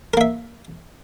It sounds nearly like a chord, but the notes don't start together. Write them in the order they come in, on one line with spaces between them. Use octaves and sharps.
A#4 A#3 E5